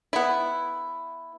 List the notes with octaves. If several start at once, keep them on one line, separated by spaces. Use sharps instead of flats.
B3 E4